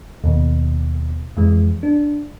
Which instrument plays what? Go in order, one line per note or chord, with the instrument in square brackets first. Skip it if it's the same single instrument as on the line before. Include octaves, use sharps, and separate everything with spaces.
[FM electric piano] D#2 B2
F2 E3 G#3
D4